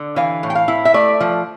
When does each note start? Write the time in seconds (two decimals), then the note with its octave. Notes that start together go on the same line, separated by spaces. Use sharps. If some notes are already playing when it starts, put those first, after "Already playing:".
Already playing: D3
0.16 E3 F5
0.43 A2
0.50 G5
0.55 F5
0.68 E4
0.85 E5
0.94 A3 D5
1.20 F3